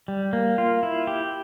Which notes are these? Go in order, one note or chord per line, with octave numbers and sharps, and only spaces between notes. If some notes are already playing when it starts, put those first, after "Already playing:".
G3
A#3
F4
E4
G4